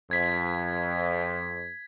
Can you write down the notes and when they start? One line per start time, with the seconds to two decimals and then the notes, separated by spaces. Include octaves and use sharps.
0.11 F2 G#6 B6